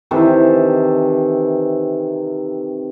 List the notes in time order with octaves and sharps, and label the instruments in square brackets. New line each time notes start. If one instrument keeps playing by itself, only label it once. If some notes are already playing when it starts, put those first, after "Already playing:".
[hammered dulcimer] C3 D#3 E3 A4